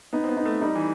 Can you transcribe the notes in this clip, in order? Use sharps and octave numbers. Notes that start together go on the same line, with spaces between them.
B3 D#4
C4
B3
D#4
A3
G3 D#4
E3